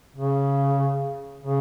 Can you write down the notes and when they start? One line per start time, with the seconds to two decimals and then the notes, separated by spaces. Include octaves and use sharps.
0.16 C#3
1.43 C#3